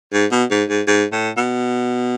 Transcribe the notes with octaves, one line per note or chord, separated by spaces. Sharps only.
G#2
B2
G#2
G#2
G#2
A2
B2